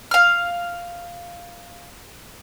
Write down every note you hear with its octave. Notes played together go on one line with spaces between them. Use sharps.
F5 F6